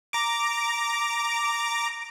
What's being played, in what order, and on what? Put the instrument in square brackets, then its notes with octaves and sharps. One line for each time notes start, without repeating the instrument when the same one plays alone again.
[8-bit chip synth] A#5 D6